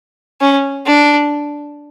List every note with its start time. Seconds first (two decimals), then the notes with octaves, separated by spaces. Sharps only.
0.41 C#4
0.87 D4